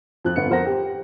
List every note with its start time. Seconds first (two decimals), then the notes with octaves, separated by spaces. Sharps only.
0.25 F2 F4 F#6
0.36 G1 B3 C#7
0.50 F2 A#4 C5 F#5 A#6
0.66 G4